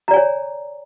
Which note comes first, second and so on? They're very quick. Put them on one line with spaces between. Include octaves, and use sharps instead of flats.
A#5 D5 G#5 C#5